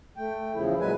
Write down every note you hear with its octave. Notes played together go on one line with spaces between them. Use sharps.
A3 G5
E2 C#3 F3 E4
A#2 F#3 G#3 B4 G#5